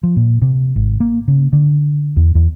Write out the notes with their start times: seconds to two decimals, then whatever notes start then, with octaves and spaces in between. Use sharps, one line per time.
0.03 F3
0.16 A#2
0.42 C3
0.76 G#1
1.00 A#3
1.28 C#3
1.53 D3
2.17 E2
2.35 E2